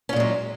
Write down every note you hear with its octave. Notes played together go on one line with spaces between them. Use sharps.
A#2 F#3 G#3 C#4